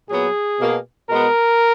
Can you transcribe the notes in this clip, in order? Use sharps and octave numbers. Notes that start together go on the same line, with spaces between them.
A#2 F#3 B3 G#4
B2 A#3
B2 G#3 B3 A#4